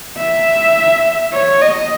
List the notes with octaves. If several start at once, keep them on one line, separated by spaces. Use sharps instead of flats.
E5
C#5
D#5